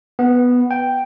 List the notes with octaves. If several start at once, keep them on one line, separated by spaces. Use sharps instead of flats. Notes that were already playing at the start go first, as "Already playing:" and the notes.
B3
G5